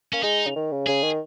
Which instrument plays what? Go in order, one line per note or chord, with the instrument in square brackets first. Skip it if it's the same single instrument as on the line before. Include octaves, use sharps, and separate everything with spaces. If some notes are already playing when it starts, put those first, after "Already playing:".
[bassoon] A#3 [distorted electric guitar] C#4
[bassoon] G#3 [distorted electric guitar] D#4
[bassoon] C#3
D#3
C#3
[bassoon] C#3 [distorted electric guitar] G#4
[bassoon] D#3